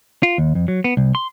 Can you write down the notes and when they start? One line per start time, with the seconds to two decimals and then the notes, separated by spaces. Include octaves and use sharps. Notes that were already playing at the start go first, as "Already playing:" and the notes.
0.23 F4
0.38 D#2
0.55 F2
0.68 F#3
0.84 B3
0.97 C2
1.15 C6